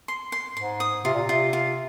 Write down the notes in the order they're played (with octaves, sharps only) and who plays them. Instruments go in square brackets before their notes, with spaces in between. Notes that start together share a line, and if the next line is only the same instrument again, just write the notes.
[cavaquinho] C6
C6
[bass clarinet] G#2 [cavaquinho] C6
[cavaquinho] D#6
[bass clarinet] C3 [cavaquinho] F4
[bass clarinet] A#2
C3
[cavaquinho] F4
F4